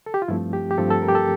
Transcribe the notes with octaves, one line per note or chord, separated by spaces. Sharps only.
A4
G4
F4
G2 F3 A3 C4 E4
G4
G4
G2 F3 A3 C4 A4
A4
A#4
G4
A4